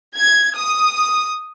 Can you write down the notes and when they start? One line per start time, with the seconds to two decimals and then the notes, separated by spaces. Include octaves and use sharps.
0.14 G#6
0.55 D#6